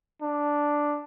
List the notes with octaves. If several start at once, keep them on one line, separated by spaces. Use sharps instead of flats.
D4